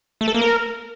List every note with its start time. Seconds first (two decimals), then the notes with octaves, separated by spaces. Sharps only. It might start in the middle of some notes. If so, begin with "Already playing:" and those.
0.21 A3
0.28 A4
0.35 A#3
0.41 A#4